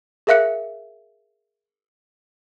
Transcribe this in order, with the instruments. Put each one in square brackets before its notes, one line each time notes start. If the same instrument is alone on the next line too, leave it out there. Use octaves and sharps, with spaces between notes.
[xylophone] G#4 A#4 E5 F5 F#6 C#7